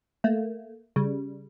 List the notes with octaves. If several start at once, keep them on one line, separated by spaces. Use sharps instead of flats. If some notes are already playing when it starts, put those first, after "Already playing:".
A3 A#3
C#3 G3